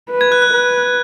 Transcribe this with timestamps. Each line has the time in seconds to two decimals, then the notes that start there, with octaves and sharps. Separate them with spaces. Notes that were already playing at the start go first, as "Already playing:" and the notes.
0.11 B4
0.21 G#6
0.32 F#6
0.42 F#6
0.53 B4